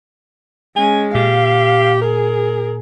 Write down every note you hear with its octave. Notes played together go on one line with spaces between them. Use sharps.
G#3 C#4 G#5
A#2 G4 F5
G#4 A#4